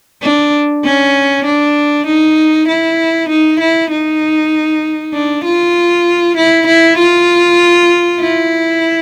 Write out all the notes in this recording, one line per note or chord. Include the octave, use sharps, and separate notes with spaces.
D4
C#4
D4
D#4
E4
D#4
E4
D#4
D4
F4
E4
E4
F4
E4